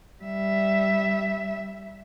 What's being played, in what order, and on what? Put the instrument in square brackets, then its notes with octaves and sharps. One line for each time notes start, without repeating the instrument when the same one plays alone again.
[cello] G3 E5